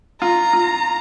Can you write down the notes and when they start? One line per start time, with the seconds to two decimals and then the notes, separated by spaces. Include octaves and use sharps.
0.21 F4 A#5
0.53 F4